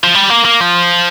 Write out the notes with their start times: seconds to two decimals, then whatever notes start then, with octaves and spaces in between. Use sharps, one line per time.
0.04 F3
0.15 G3
0.30 A#3
0.45 A#3
0.61 F3